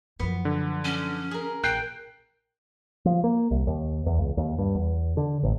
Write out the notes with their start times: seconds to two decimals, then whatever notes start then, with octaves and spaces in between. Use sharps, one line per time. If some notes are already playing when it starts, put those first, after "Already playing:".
0.19 F#2 F3 B3
0.45 D3
0.85 C#4
1.31 G#4 A#4
1.64 A#1 G5 F#6 G6 C7
3.05 F3
3.24 A#3
3.51 C2
3.67 D#2
4.06 E2
4.18 C#2
4.37 D#2
4.59 G2
4.75 E2
5.17 D3
5.43 A1